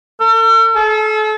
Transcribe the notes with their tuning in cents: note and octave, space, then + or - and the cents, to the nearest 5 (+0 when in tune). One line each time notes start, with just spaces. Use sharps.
A4 +45
A4 -35